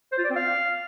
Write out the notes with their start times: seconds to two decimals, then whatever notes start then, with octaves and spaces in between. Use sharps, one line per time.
0.12 C5
0.18 F4
0.24 D5
0.30 C4
0.36 F5